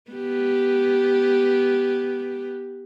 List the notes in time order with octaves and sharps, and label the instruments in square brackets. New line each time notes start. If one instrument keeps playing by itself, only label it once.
[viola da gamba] B3 G4